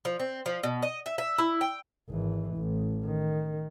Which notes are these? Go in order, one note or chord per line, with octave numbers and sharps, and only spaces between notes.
F3
C4
F3
B2
D#5
E5
E5
E4
G5
G#1 E3
A1
D#3